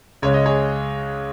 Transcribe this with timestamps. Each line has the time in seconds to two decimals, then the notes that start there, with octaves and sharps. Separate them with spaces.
0.22 C#2 C#3 G#3 C#5
0.34 D#5
0.46 G#4 C#5